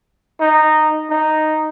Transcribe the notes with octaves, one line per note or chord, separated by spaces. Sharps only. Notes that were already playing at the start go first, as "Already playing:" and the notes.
D#4
D#4